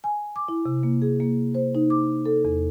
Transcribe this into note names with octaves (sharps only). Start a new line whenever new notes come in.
G#5
D6
E4
C3
A#3
G#4
A#3
C5
D#4
D6
A4
E2